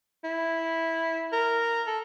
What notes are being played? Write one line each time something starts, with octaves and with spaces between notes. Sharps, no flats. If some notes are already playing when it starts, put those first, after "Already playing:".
E4
A#4
A4